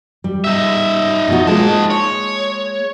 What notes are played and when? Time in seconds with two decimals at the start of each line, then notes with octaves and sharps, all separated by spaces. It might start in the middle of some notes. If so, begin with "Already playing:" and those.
0.24 G3
0.44 D#4 E5
1.28 B2 F3 F#4
1.47 G#3 A#3 D#4 F4 A5
1.90 C#5